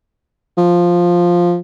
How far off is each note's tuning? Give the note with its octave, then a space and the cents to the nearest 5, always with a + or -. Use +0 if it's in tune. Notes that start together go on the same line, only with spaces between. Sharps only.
F3 +5